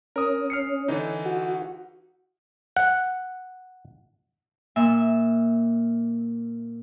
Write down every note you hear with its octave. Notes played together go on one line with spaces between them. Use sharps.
C#4 A#4 D#6
F6 C7 C#7
D3 E3 D#4
F#4
F#5
A#2 E5